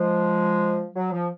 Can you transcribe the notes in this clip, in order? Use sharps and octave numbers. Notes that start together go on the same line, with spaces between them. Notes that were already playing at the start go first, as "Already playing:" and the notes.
Already playing: F3 G#3
F#3
F3